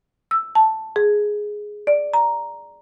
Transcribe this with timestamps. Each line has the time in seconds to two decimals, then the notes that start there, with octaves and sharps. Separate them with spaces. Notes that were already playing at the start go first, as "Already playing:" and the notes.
0.31 E6
0.55 A5
0.96 G#4
1.87 D5
2.14 A#5